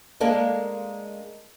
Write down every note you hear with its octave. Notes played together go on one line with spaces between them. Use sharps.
G#3 A#3 D4